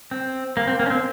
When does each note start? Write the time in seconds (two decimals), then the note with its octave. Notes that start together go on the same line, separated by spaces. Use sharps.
0.11 C4
0.57 A#3
0.68 C4
0.79 A#3
0.86 C#4
0.90 C4